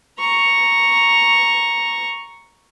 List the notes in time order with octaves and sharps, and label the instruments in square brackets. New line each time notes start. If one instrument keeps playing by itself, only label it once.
[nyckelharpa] A#5 C#6